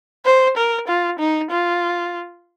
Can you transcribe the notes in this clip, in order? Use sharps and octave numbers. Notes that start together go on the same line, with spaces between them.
C5
A#4
F4
D#4
F4